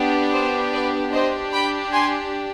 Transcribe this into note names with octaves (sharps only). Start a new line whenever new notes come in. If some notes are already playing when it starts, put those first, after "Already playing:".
Already playing: B3 D4 G4
C5
B4 D5
D4 G4 C5 D#5
G5 B5
G#5 C6